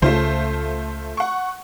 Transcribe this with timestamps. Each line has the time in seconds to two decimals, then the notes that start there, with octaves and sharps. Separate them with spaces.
0.02 C#2 C#3 A3 F4 C5
1.17 F#5 C#6